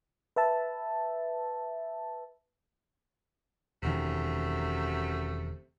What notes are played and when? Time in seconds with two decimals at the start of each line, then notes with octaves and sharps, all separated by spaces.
0.36 B4 E5 A5
3.83 E1 F#2 C3 D#3 A3